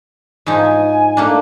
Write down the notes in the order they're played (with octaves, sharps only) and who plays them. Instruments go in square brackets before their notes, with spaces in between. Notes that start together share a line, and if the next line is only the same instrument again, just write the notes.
[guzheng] G#2 F3 D#4 [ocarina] G#5
[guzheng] A3 A#3 D4